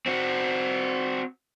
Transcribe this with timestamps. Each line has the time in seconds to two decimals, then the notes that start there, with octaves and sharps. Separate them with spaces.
0.06 C4 F#4